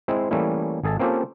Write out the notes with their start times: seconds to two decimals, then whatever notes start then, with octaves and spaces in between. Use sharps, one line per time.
0.08 G#3 C4 E4
0.31 E3 G3 A3 A#3 C#4 E4
0.83 G#1 G#4 A4 A5
0.99 A#3 C4 C#4 F4 G4 A4